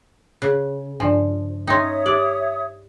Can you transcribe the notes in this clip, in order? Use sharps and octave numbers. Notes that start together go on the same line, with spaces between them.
C#3 F#6
G2 F3 D4 D5
C#4 D#4 C#5 E5 G5 C6 D#6
G4 D5